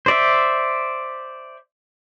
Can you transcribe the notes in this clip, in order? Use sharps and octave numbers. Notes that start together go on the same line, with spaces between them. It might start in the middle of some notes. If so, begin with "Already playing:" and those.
C5 D5 E5